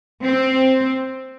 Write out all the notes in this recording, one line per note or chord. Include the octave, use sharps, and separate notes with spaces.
C4